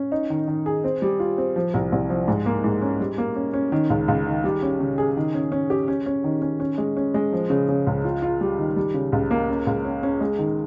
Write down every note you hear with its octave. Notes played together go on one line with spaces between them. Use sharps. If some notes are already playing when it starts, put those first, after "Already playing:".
Already playing: C#4
D#4
D#3
D#3
G#4
C4
G3
F4
C4
F3
C2
C2
F3
G#2
A#3
G#2
C#4
G3
A#3
C#4
C#4
D#3
C#2
C#2
D#3
G3
C#4
C#3
G#4
D#3
C#4
C#4
G4
C#4
C#4
D#3
C#4
C#4
G#3
C#4
G#3
F3
C#3
C#3
C#2
F4
F4
G3
D#3
G3
C#3
C#2
A#3
C#4
C#2
C#4
C#4
G#3
D#3